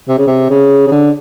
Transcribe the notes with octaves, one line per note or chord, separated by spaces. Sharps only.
C3
C#3
C3
C#3
C#3
D3